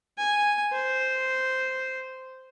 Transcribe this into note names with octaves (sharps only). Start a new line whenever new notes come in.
G#5
C5